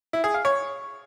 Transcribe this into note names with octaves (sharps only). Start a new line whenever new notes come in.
E4
G#4
F5
C#5